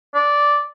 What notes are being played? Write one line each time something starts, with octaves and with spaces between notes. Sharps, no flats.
D5